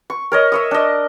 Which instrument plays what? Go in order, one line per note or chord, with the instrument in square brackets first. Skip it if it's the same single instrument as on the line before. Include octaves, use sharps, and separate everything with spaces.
[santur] C#6
A#4 C#5 D#5
E5 C#6 D#6
D4 D#5